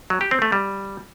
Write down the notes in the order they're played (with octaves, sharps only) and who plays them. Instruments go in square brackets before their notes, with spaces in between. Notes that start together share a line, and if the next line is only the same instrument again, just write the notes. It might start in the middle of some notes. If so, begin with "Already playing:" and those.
[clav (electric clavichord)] F#3
G4
C4
A3
G3